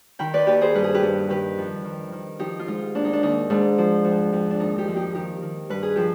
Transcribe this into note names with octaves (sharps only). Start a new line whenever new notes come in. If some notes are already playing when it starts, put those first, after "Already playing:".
D#3 G5 B5
B4 D5
D#2 G4 B4
G#4 C5
G2 B4
G#4
G4 B4
G2
D#3 G4 B4
F2
D#3
D#3
F3 D#4 G4
F4
G#2 D#4
D#2 D4
D#4
D4
D#2 D#4
G#2 D4
F3
F2
F2
D4
D#2 D#4
D#4 G4
F3
D#4 G4
D#3 D#4 G4
D#3
G2 B4
G#4
F3 G4